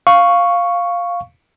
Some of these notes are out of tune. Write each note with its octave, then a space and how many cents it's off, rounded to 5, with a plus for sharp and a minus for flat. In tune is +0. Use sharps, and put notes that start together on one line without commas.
F5 +0 C#6 +0